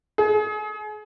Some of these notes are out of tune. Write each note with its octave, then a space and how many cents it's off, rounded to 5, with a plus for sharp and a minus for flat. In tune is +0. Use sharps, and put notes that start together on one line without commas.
G#4 +35